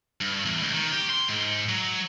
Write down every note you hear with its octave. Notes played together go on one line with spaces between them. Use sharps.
G2
E2
C#2
D#3
G4
C6
G#2
F#3